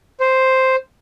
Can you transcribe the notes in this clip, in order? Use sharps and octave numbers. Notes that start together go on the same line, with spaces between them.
C5